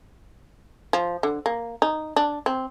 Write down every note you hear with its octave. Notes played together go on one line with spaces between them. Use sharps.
F3
D3
A#3
D#4
D4
C4